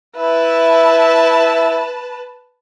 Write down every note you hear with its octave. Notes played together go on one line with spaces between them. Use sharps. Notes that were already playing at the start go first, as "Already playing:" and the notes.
E4 B4 E5 A5